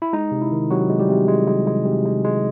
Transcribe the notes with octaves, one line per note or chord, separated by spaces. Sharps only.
E4
G#3 D#4
C3
E4
D#3
C3 F#3 F#4
G#3
G3 G4
C3
G#3
G#3
G#3
C3
G#3
G#3